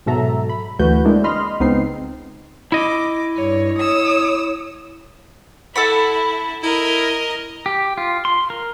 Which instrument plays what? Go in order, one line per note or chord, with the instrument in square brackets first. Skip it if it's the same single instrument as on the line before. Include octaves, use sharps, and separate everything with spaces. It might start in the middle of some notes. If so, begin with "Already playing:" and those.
[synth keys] G#2 B2 F#3 A4 E5 A#5
B5
D2 E3 A3 F#4 B4 G6
G#3 A#3 C4 D4 E4
D#5 B5 C6 F6
C#2 B3 C4 D#4 C7
[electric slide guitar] E4 D#5 [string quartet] D6
[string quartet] G2 C#5
C#5 D#6 E6
[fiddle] E4 [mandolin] A4 F#5 B5
[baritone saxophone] E4 [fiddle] A#4 D#5
[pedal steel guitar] G4
F4
C6
A#4